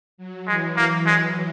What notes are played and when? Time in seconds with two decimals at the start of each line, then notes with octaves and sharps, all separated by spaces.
0.18 F#3
0.47 E3 G#3
0.76 A#3
1.06 G#3